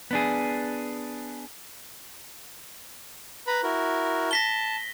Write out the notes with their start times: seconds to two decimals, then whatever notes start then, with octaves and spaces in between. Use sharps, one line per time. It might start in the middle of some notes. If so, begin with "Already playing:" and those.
0.11 B3 D4 G#4
3.47 B4 A#5 B5
3.63 E4 F#4 A#4
4.31 A5 A#6 B6 G7